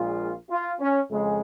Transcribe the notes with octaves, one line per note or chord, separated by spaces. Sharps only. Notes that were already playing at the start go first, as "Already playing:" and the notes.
Already playing: A#1 A#2 G#3 F4
F4
C#4
F2 C#3 G#3